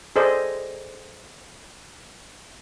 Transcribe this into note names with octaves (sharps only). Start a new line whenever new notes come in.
G#4 A4 C5 D5 D#5